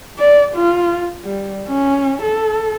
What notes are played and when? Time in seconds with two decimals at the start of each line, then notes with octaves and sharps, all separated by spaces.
0.19 D5
0.55 F4
1.24 G3
1.68 C#4
2.23 A4